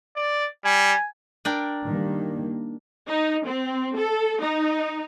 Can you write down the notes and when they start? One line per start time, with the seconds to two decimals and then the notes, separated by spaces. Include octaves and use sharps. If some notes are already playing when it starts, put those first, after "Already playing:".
0.16 D5
0.65 G3 G#5
1.45 D4 A#4 G5
1.86 D#3 G3 A#3
3.08 D#4
3.46 C4
3.96 A4
4.41 D#4